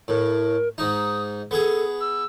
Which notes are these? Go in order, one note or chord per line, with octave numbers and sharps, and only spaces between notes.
A2 A#4
G#2 D#4 D#6
B3 G#4 A4
E6